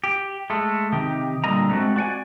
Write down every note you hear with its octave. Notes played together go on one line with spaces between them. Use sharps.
G4
G#3 A3
C3 D#3 D#4 G4
A#2 D3 G3 A#4 D#5 A#5
G#3 A3 C4 F#4
F#4 D5 F#5 G#5